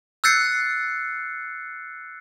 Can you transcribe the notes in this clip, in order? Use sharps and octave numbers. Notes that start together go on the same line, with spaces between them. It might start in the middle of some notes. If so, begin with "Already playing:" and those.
E6 F#6 G6 A6 C7 C#7